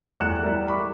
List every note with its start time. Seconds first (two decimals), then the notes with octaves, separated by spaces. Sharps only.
0.20 E2 G3 A3 F#6 C#7 E7
0.43 G3 E4 A#4
0.68 B5 C#6 D6